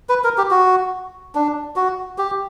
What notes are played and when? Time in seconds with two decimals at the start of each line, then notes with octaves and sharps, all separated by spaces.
0.09 B4
0.24 A#4
0.38 G4
0.51 F#4
1.35 D4
1.76 F#4
2.18 G4